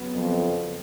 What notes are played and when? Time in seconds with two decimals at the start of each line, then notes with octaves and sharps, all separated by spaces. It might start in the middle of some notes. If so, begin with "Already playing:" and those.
Already playing: C#3 F#3 B3
0.12 F2